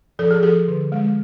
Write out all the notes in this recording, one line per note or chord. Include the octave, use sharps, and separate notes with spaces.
F3 A4
G#4
F3 G4 A4
D3
G#3